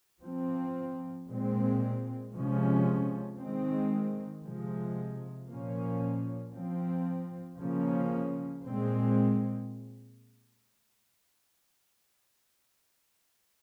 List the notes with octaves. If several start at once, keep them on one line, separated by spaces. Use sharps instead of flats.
F3 C4
A#2 G#3 C4
C3 F3 G#3 C#4
D#3 G#3 C4
C3 F3 G#3
A#2 F3 A#3 C#4
F3 C4
C#3 F3 A#3 C#4
A#2 G#3 C4